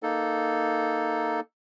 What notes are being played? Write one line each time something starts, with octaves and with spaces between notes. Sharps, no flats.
A#3 D#4 A4